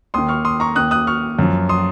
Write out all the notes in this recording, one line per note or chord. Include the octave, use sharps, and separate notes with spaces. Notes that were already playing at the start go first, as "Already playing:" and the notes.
D#2 D#3 C6 D#6
C#6 F6
C6 D#6
A#5 C#6
D#2 D#3 D#6 F#6
D#6 F#6
C#6 F6
F#2 F3
C6 D#6